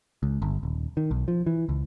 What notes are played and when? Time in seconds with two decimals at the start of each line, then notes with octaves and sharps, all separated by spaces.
0.23 C#2
0.42 G1
0.63 D#1
0.97 D#3
1.11 B1
1.28 F3
1.46 E3
1.69 C#2